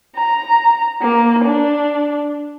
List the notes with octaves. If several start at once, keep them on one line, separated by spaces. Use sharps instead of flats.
A#5
A#3
D4